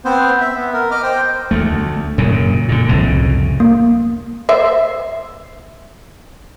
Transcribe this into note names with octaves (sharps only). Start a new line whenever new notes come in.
B3 C4 C5
E5
B3
A#4
D#5 D6 F6
C5 G5
D2 A3
F#2 A#2 C#3
A#2 D3
C2 F2 A2 C#3
A#3
C5 E5